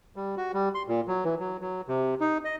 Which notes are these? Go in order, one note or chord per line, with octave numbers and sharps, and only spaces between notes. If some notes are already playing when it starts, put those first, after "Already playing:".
G3
F#4
G3
C6
A#2
F#3
E3
F#3
F#3
C3
D#4
D#5